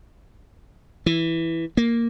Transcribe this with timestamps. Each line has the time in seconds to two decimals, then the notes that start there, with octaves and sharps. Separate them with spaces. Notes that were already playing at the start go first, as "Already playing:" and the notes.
1.06 E3
1.77 A#3